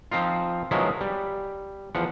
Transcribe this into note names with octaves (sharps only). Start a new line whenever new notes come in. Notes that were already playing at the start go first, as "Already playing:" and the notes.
F3 C4 D#4 F4
D#3 F3 F#3 G#3 B3 E4
G3
E2 F3 F#5